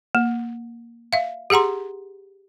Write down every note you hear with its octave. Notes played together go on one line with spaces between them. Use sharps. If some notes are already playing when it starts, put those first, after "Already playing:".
A#3
E5 F5
G4 G#4 F#5 A#5 C6